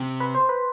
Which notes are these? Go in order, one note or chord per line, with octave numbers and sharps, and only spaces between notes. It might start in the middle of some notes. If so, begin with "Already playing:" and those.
Already playing: C3
B4
C5
B4